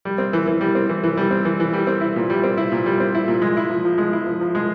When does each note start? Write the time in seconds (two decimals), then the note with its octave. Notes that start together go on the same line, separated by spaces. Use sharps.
0.05 G3
0.18 C4
0.33 E3
0.47 E3
0.61 G3
0.75 C4
0.89 E3
1.03 E3
1.17 G3
1.31 C4
1.45 E3
1.60 E3
1.73 G3
1.87 C4
2.01 E4
2.16 A#2
2.30 G3
2.43 C4
2.57 E4
2.72 A#2
2.86 G3
3.00 C4
3.14 E4
3.28 A#2
3.42 G#3
3.57 E4
3.70 F3
3.85 F3
3.98 G#3
4.13 E4
4.26 F3
4.41 F3
4.55 G#3